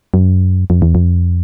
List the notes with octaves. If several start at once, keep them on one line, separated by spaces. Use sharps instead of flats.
F#2
F2
E2
F2